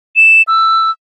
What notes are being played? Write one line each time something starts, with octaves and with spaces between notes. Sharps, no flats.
E7
E6